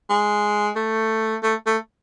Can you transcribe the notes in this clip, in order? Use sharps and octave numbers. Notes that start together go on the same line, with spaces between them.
G#3
A3
A3
A3